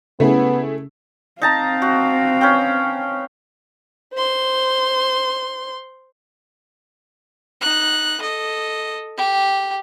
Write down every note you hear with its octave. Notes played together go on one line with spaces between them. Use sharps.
C#3 A3 B3 E4 G#4
C4 D#4 F5 A5 A#5
F#4
C#4 B4 G5
C5 C6
D#4 F#6
A4 D#5
G4